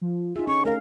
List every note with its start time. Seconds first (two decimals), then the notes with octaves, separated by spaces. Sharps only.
0.01 F3
0.36 D#4 F4 G#4 E5
0.47 D3 C#4 C#6
0.65 A3 A#4 F5